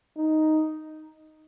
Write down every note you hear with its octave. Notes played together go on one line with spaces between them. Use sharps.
D#4